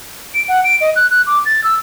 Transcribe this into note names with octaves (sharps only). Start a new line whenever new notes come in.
D7
F#5
D7
D#5
F#6
F#6
D6
A6
E6